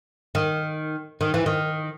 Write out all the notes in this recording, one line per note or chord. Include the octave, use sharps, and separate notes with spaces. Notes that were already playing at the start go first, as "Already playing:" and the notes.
D#3
D#3
E3
D#3